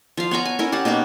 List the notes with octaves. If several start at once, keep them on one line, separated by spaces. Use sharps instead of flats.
F3 F5
B3 C#5 G#5 A#5
G#5
C#4 E4 A#4
G4 F#5 A5
B2 A#3 D#4 B4